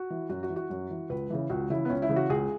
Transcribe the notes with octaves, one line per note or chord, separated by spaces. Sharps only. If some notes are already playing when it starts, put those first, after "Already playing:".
Already playing: F#4
E3
F#2 F#4
F#4
E3
F#4
F#2
E3
C#2 B4
C#3 E3
C#2 F#4
C#3 E3 E4
B3
C#2 C#4
E4
C#3 E3
F#4
C#2 G#4